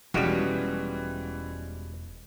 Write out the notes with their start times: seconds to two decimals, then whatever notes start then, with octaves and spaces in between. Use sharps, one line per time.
0.14 E1 E3 F3 G3 G#3 C#4 F#4 B4